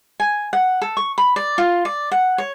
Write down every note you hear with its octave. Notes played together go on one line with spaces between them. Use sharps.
G#5
F#5
A4
C#6
B5
D5
F4
D5
F#5
C#5